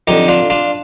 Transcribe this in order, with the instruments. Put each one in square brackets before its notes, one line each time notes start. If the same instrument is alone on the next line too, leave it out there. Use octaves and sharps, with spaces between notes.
[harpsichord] F2 D3 D#4 G4
D4 F4
D4 F4